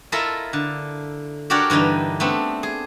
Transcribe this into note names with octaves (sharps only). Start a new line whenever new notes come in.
E4 F4 A4 A#4 D#5 E5
D3
D4 F#4 G4 A#4 C#5 D5
G2 D3 E3 D#4 D#5
A3 B3 C4 D4
G#4